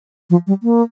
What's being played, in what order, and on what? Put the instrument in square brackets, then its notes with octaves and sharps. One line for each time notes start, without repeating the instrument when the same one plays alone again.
[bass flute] F3
G3
A#3